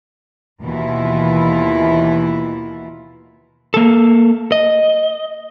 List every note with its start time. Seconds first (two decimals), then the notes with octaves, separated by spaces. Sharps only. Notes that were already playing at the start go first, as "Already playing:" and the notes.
0.60 D#2 B2 E3 E4 F4
3.74 A#3 A4
4.52 D#5